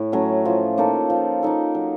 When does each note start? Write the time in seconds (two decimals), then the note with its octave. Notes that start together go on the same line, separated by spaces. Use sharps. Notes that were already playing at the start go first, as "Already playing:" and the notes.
Already playing: A2
0.12 F#3 A3 C#4
0.45 F3
0.78 A#3 D#4 A4
1.10 F3
1.43 A#3 D#4 A4
1.75 F#3